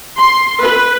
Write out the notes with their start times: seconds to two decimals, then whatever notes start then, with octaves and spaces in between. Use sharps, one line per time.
0.16 C6
0.61 B4